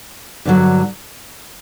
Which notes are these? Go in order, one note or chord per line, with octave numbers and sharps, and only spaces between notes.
G2 D3 F#3